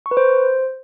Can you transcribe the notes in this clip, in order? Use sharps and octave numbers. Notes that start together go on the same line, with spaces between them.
C#6
B4
C5